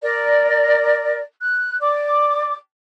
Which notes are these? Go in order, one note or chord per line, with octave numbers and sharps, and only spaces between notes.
A#4 D5
F#6
D5 D6